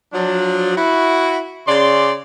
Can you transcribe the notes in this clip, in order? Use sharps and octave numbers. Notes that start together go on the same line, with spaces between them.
F3 F#3 D4
E4 F#4
C#3 D5 C6